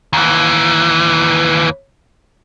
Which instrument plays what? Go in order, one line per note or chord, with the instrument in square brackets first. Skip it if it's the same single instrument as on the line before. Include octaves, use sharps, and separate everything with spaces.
[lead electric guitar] D#2 E3